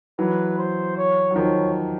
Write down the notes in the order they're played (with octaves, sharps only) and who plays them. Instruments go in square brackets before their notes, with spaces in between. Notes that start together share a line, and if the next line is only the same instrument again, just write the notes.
[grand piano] E3 F#3 [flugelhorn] B4
[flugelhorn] C5
C#5
[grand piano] F#3
[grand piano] D#3 F3 [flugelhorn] C#5